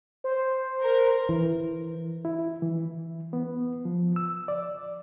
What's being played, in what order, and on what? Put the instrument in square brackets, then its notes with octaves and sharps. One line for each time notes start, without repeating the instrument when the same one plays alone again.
[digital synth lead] C5
[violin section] A#4
[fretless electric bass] E3
[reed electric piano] E4
E3
B3
F3
E6
D5